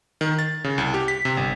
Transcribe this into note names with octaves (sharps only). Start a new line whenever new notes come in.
D#3
A6
C#3
C2
G4
B6
C3
G1